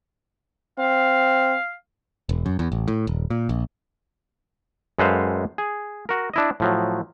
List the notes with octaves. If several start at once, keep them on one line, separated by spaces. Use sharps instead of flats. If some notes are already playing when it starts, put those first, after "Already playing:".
C4 F5
E1
F#2
E2
A1
A2
D#1
A#2
A#1
F#2 G#3 A4 B4 C5 F5
G#4
F#4 A#4
D4 E4 D#5
A2 F3 F#3